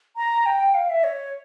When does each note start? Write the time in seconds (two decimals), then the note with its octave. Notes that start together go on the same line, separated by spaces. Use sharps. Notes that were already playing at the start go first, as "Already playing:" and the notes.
0.16 A#5
0.46 G5
0.74 F5
0.89 E5
1.04 C#5